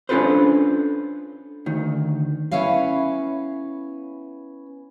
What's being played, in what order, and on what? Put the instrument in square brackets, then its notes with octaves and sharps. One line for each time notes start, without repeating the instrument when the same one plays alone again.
[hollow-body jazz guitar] C#4 D4 F4 A4 B4 C5
D2 D#3
[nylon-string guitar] B3 C#4 E4 C#5 F5